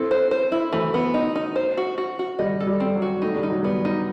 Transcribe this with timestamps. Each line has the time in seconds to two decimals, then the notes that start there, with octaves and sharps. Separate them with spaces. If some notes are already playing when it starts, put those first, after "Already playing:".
Already playing: C4 E4 A4
0.11 C5
0.31 C5
0.52 E4
0.73 E3 F#3 A3
0.94 B3
1.14 D#4
1.36 D#4
1.56 C5
1.77 F#4
1.98 F#4
2.19 F#4
2.39 G3 D#5
2.60 A4
2.67 G3
2.80 C4
2.95 F#3
3.02 F#4
3.22 A3 D#4
3.36 G3
3.43 D#4
3.49 F#3
3.63 G3 B3
3.85 D#4